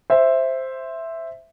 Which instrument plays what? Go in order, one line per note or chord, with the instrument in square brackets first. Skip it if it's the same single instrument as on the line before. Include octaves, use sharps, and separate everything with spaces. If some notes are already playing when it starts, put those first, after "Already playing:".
[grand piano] C5 E5